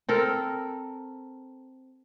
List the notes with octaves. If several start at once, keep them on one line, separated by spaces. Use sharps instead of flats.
C4 A4 A#4